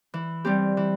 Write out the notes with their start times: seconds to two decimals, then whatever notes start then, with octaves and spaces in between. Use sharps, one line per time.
0.14 E3
0.45 G3 C4 G4
0.77 E3